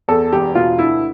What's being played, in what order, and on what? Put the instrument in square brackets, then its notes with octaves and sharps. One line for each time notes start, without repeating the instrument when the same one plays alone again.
[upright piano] E2 A4
E1 G4
B2 F4
D2 E4